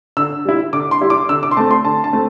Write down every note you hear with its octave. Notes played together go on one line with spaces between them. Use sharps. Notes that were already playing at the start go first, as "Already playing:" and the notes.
D3 E6
G3 E4
D3 D6
C6
G3 E4
D6
D3 E6
D6
C6
A3 C4 A5
C6
D3 A5
A5
A3 C4